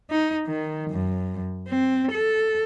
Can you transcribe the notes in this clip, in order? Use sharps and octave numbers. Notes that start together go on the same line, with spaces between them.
D#4
D#3
F#2
C4
A4